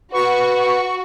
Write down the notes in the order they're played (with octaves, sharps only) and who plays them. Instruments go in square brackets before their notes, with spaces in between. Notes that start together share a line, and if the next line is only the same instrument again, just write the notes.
[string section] F#4 [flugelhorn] B4 [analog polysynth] C#6